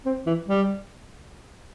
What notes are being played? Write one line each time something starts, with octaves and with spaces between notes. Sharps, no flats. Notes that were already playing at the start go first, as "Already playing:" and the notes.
C4
E3
G3